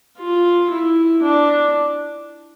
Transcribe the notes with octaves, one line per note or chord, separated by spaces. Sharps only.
F4
E4
D4